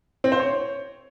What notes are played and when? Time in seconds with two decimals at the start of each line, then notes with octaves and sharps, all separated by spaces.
0.24 C4
0.32 C5
0.40 C#5